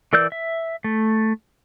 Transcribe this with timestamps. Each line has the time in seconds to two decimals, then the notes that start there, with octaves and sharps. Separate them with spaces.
0.13 E3 A#4 D5 E6 G6
0.32 E5
0.84 A3